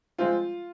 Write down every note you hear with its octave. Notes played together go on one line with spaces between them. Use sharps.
F3 G#3 C4 F4